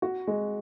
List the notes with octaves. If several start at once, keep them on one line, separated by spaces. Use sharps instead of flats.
F#4
G#3